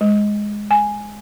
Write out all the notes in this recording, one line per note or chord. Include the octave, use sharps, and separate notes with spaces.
G#3
G#5